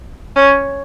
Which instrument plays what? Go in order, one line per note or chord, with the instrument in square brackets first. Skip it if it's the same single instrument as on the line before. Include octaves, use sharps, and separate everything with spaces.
[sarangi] C#4